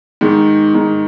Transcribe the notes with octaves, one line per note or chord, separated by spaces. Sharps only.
G#2 D#3
G#2 D#3